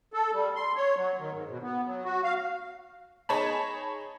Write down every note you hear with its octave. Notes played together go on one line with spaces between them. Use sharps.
A4
G3
C6
C#5
F#3
D#3
G#2
B2
B3
F#3
F#4
F5
D#4 G#4 C#5 A5 B5